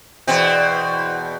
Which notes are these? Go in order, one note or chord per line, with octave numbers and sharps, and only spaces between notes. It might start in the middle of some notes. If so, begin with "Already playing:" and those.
E2 B2 C4